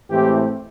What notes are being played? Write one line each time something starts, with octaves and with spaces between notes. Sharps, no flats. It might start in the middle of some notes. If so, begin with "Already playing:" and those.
A2 E3 G#3 C4 G4